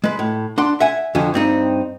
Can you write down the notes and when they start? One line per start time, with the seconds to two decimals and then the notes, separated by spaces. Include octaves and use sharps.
0.04 G#3 B4
0.19 A2
0.58 D4 F#5 C6
0.80 E5 F#5 G#5
1.15 F2 D3 C#4
1.34 G2 C4 D#4